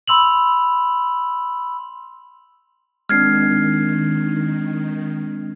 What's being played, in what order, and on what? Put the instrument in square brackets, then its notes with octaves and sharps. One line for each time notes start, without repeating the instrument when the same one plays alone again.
[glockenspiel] B5 C6 E6 F7 F#7
[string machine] D#3 [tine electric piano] G#3 C4 D4 [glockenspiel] F6 G#6 C7